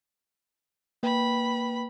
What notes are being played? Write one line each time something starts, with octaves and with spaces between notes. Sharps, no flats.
A#3 B4 G5 B5